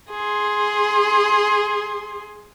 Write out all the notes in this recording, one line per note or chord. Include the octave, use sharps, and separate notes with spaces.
G#4 C6